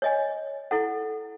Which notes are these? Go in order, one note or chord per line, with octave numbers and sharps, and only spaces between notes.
C#5 D#5 G#5
E4 A4 F#5